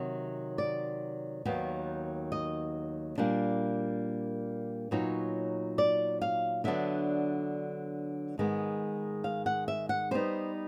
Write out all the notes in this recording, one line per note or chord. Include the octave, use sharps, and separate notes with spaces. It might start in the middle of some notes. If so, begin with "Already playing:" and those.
Already playing: C3 D#3 F#3 C#5
D5
D#2 D#3 F#3 B3
D#5
A#2 G3 A#3 D4
A#2 F#3 B3 D#4 C#5
D5
F5
D3 F#3 B3 D4 E5
G#2 D#3 G#3 B3
F5
F#5
E5
F#5
D3 G3 B3 D#4 C5